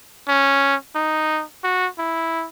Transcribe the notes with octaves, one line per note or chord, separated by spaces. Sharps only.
C#4
D#4
F#4
E4